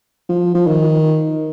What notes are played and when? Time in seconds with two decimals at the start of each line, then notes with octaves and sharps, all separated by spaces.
0.29 F3
0.55 F3
0.67 D#3